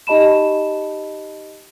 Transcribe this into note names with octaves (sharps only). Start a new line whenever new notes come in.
D#4 G4 D#5 A5 B5 E7